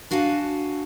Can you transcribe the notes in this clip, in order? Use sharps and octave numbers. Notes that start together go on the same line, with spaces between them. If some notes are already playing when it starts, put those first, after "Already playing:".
D4 F#4 F5 G#5 A5